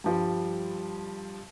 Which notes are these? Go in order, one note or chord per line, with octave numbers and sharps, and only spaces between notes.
G2 F3 G3